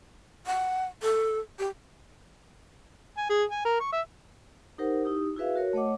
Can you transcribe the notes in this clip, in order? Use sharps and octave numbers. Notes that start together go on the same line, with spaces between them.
F#5
A4
G4
G#5
G#4
G#5
A#4
C#6
E5
D#4 G4 A#4 C5 F#5
D#4 E4 G4 D#6
E4 F#4 G#4 B4 E5 F5
F#4 A#4 C#5
A3 C#5 D#5 F#5 D6